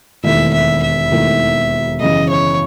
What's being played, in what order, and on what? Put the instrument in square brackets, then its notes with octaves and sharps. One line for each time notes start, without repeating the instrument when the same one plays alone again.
[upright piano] E1 D#2 D#3 A3 E4 [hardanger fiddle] E5
[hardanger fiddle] E5
E5
[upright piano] E1 D#2 D#3 A3 E4
[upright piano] F#2 C#3 E3 [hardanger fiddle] D#5
[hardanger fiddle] C#5